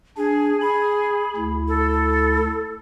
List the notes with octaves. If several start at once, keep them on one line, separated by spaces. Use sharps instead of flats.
D4 G#4
G#4 B5
D2 E4
A4